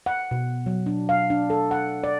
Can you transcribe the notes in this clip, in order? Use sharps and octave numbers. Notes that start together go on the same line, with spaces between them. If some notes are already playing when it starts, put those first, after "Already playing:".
F#5
B2
F#3
D4
F5
D4
A4
F#5
D5